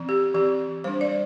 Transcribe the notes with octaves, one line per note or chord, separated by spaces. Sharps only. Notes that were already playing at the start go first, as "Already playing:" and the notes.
Already playing: E3 C4
G4
E3 C4 G4
G3 D4 C5
D5